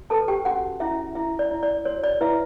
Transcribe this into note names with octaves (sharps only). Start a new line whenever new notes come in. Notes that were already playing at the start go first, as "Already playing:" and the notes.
Already playing: F#4
A4 B4 A5
G4 G5
C#4 F#4 F#5
C#4 E4 E5
E4 E5
D5
E4
D5
F#4 C#5
D5
E4 B4 E5